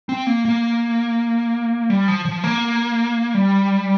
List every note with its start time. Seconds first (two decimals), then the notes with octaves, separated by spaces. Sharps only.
0.09 C4
0.27 A#3
0.45 A#3
1.90 G3
2.08 F3
2.25 F3
2.44 A#3
3.34 G3